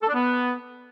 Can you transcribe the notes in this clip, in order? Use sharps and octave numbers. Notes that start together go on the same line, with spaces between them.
A4
D4
B3